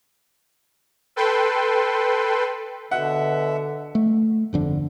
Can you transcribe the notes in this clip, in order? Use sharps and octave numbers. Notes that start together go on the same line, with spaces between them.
A4 B4 G5 C6
B2 D3 E5 F#5
A3
G1 F2 D3